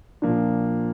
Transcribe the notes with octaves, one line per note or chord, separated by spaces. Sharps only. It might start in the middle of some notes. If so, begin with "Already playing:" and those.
A#2 F3 A#3 D4